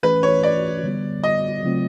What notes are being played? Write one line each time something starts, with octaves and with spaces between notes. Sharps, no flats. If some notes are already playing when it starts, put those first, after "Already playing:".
E3 A3 C#4 B4
C#5
D5
D3 G3 B3
D#5
C#3 F#3 A3 C4 F4